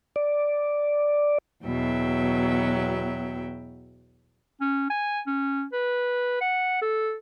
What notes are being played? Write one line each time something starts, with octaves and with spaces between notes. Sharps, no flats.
D5
E2 B2 F#3 E5 G5
C#4
G#5
C#4
B4
F#5
A4